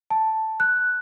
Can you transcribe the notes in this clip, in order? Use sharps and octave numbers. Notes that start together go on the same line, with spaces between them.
A5
F#6